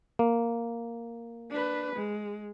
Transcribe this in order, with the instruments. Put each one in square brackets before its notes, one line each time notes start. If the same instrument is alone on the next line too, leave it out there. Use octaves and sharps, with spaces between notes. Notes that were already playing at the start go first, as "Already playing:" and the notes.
[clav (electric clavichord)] A#3
[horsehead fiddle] D4 B4
G#3